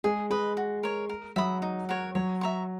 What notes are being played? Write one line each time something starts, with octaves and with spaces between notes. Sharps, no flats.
G#3 G#4
G#3 B4 D#5
F#4
A#4 C#5
A#4
F#3 E5 B5 D#6
D#4
F#4 A#4 C#5
F#3 C#5
E5 A#5 C#6